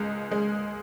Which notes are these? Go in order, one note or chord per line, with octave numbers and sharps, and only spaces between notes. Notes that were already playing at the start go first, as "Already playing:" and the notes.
Already playing: C#2 G#3
G#3